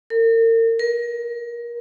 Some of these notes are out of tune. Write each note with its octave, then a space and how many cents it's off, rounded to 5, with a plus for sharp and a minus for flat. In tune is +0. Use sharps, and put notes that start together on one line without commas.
A#4 -40
A#4 +25